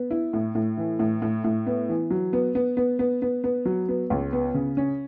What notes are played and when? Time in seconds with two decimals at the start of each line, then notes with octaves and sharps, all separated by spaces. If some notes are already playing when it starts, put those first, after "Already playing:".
Already playing: B3
0.11 E4
0.33 A2
0.55 A2
0.77 E3
0.99 A2
1.22 A2
1.44 A2
1.66 B3
1.89 E3
2.11 F#3
2.33 B3
2.55 B3
2.77 B3
2.99 B3
3.22 B3
3.44 B3
3.65 F#3
3.89 B3
4.10 C#2
4.33 B3
4.54 C#3
4.77 C#4